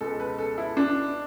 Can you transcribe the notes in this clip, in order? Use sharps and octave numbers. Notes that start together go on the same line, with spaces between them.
C#2 B2 G#3 A4
B4
A4
E4
D4